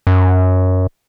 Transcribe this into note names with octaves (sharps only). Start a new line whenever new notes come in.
F#2